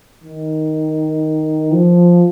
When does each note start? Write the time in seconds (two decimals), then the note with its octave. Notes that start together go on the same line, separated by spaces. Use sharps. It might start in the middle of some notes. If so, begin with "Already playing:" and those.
0.24 D#3
1.73 F3